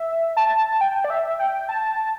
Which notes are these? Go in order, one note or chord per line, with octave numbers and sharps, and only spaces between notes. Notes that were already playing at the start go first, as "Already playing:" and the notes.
Already playing: E5
A5
G5
D5
E5
G5
A5